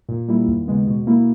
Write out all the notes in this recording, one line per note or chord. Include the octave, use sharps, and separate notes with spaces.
A#2
G3 A#3 E4
D#2
C#3 G#3 B3
B2
A#3 E4